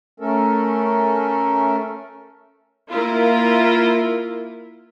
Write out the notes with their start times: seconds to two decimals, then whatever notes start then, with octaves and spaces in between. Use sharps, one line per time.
0.20 A3 C#4 A4 A#4
2.91 A#3 E4 F4 A#4